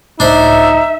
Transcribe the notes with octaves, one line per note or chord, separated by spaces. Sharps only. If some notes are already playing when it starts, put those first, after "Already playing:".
C#2 A2 D4 D#4 C5 E5